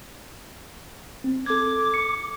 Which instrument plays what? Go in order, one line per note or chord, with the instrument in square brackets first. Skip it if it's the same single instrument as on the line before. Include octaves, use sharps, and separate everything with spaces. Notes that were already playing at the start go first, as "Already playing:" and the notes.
[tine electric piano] C4
[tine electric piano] A4 G#6 [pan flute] D6
[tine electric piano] C#7